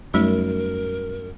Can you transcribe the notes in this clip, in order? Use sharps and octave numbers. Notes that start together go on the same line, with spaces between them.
F#2 G3 A3 D#4 A#4